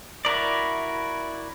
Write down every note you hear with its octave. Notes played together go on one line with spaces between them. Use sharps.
E4 F#4 A#4 D5